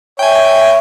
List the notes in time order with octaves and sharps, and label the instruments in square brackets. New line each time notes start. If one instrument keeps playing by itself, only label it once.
[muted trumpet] C#5 [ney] E5 [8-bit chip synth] G5 G#5